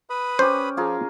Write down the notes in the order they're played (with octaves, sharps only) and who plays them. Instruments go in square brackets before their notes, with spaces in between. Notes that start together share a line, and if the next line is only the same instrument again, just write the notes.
[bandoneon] B4 B5 D#6
[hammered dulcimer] C#4 G4 [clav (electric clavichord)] C5
[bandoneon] F3 [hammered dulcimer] F4 G#4 A#4